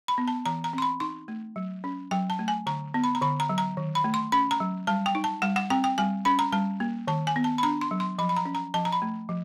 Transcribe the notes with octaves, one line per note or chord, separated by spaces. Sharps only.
B5
B3
A5
E3 A#5
A#5
C4 C6
B5
D#4 C6
A3
F#3
C#4
F#3 G5
A5
A3
G#5
D3 A#5
B3
B5
A#5
D3 B5
A#5
F#3
A#5
D#3
B5
A3
C6
C#4 B5
A#5
F#3
G3 A5
G5
D#4
A5
G3 F#5
F#5
C4 G5
G5
G3 G#5
C#4 B5
A#5
G3 A5
A#3
D#3 A5
G#5
B3
A5
B5
D4 A#5
C6
F#3
C6
F3 B5
B5
A#5
C#4
A#5
F3 A5
A#5
B5
A3
F3